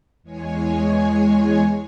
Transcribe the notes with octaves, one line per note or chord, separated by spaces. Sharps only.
E2 G#3 C#5 G#5